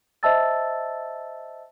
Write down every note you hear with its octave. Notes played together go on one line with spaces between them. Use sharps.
C5 D#5 E5 A5 E6 A6